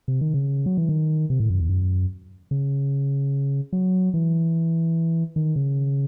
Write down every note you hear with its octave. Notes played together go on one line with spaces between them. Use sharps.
C3
D#3
C#3
F#3
E3
D#3
C3
A2
F#2
E2
F#2
C#3
F#3
E3
D#3
C#3